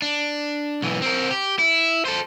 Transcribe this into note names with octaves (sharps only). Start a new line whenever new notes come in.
D4
B1 E3
C4 A#4
G4
E4
A4 C5